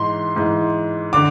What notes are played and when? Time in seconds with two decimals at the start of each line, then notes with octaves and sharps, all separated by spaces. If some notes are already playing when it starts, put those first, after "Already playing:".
Already playing: G#2 E3 C6
0.36 G#2 E3
1.13 D3 D6